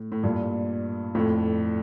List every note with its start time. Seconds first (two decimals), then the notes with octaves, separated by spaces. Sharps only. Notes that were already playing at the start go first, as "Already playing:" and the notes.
Already playing: A2
0.12 A2
0.23 G2 A#2
1.15 F2 A2